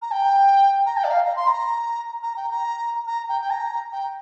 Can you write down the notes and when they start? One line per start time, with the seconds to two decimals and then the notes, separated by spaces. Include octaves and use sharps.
0.02 A#5
0.11 G5
0.86 A#5
0.97 G5
1.04 D5
1.10 F5
1.25 A#5
1.36 C6
1.47 A#5
2.23 A#5
2.36 G5
2.51 A#5
3.07 A#5
3.29 G5
3.41 G5
3.50 A#5
3.92 G5